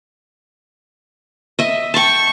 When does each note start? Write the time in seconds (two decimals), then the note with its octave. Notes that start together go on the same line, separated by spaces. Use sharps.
1.59 D#5 E5
1.94 G5 A5 C#6